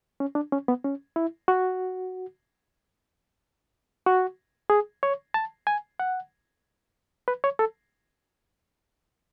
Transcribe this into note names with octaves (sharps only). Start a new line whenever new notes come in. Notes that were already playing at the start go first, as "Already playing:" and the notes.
C#4
D4
C#4
B3
C#4
E4
F#4
F#4
G#4
C#5
A5
G#5
F#5
B4
C#5
A4